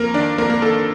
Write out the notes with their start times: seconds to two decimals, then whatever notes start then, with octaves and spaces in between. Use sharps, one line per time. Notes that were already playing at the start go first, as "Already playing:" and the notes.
Already playing: F2 A#3 A#4
0.14 D#3 D4 D5
0.38 F2 A#3 A#4
0.50 A#3 A#4
0.62 D#3 A4